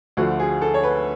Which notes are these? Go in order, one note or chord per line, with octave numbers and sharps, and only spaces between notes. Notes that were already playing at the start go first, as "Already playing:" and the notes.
D2 D3 F3 A3 F#4
G#4
A4
C#5
B4